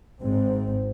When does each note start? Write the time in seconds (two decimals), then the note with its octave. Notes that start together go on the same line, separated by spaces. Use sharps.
0.22 G#1 G#2 C4